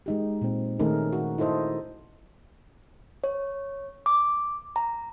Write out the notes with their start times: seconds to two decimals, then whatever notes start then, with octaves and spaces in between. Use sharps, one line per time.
0.06 G#3 D#4 G4
0.41 A#2 C4
0.80 D#3 A3 C#4 D#4 G#4 A#4
1.13 F#4
1.38 D#4 E4 A4 C5 D#5
3.24 C#5
4.06 D6
4.76 A#5